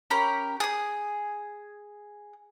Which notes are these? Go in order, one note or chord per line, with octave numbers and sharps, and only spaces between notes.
C#4 G4 A#4 B5
G#4 D#6